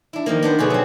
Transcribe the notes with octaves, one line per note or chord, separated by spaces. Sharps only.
D4 E4
D#3 F3 A#3
B3 D4 C5
B2 D3 G#4 B4
F#3 C4